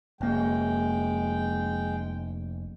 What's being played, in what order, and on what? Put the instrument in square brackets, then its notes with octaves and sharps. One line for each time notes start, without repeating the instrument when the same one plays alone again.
[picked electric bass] F1 A#3 [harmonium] G#3 G5